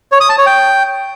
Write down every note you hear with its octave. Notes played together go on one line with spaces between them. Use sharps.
C#5
D#6
A5
C#5
G5